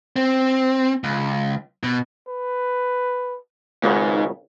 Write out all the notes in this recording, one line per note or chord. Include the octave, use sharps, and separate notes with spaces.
C4
C#2
B2
B4
G#1 C#2 G#2 C#3